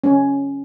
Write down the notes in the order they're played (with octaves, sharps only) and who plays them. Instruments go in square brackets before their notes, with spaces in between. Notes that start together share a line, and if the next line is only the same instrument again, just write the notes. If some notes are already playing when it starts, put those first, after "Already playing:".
[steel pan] C#4